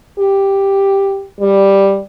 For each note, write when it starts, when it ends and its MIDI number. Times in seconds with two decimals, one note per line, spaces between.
0.19 1.27 67
1.41 2.01 55